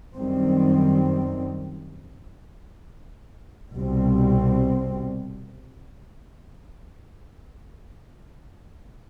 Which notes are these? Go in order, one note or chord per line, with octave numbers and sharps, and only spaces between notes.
F#2 D#3 G3 C4
C2 B2 G3 C4